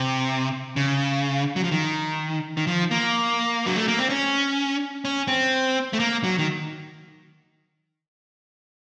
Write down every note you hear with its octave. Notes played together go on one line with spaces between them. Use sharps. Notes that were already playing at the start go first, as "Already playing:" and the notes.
Already playing: C3
C#3
F#3
F3
D#3
D#3
F3
A#3
F#3
A3
A#3
C4
C#4
C#4
C4
A3
A#3
F#3
D#3